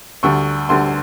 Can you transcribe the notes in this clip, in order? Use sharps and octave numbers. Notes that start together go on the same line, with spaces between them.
D2 D3 G3 C#6
D2 D3 G3 C6